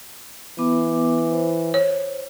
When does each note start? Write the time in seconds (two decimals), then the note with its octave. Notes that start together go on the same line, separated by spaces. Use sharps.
0.59 E3 B3 D6
1.31 C5
1.74 C#5